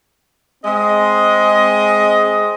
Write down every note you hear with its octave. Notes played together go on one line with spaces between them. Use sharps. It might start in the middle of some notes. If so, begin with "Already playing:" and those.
G#3 C4 G#4 D#5